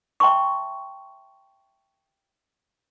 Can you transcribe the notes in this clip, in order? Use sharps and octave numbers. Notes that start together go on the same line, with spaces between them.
E5 G5 A5 C6 C#6